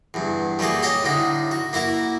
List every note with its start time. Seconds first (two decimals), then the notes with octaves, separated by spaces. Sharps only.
0.14 E2 G2
0.59 G3 A3 A#3 F#4 G#4
0.83 F#4 G4 C#5 D#5 G5
1.03 A2 D3 D#4
1.51 F#4
1.73 A#3 E4 F#4 A#4